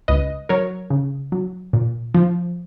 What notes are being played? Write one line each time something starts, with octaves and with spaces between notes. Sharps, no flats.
C#2 B4 D#5
F#3 A#4 C#5
C#3
F#3
A#2
F3